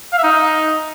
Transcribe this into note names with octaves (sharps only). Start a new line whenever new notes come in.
F5
E5
D#4